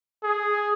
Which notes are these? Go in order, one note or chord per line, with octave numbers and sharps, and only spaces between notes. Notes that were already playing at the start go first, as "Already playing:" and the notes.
G#4